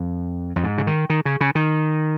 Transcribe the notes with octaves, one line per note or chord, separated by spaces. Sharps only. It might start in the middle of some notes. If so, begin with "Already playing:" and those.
Already playing: F2
F2
G#2
C#3
D#3
D#3
C#3
C#3
D#3